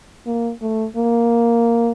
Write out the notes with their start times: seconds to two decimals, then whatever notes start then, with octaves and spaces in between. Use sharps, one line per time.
0.27 A#3
0.62 A3
0.96 A#3